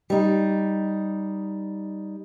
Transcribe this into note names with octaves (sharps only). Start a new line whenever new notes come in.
G3 D#4